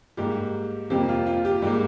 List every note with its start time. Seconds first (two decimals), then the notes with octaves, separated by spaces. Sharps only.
0.17 G#2 G3 A#3 G4
0.90 F2 C3 F3 A#3 G4
1.09 F4
1.26 F4
1.45 G4
1.62 G#2 G3 A#3 G4